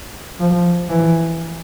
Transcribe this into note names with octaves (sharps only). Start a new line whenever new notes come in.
F3
E3